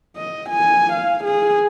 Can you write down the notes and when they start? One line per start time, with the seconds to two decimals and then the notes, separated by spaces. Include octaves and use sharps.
0.16 D#5
0.50 G#5
0.93 F5
1.24 G#4